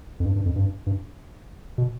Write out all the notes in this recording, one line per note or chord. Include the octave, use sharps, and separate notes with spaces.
F2
G2
G2
F2
G2
G2
B2